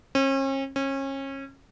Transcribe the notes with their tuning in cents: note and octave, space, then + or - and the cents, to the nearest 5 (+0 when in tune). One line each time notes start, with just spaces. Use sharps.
C#4 -40
C#4 -30